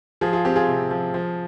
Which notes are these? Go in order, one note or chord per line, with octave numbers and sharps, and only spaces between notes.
F3 F4 G#4
F4 G#4
C4 G4
F4 G#4
C3
F3
F3